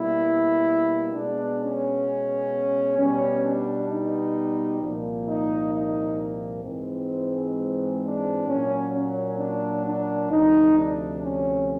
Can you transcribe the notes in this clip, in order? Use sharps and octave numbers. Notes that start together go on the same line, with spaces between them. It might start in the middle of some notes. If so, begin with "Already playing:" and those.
Already playing: B2 G3 A#3 E4
B2 G#3 B3 D4
C#4
B2 G3 B3 C#4
D4
D#4
C2 A#2 F3 A#3
D#4
D#4
G#2 E3 G#3 C4
D4
A#2 F#3 A#3 C#4
C#4
D4
D4
D2 C3 F3 D#4
D4
C#4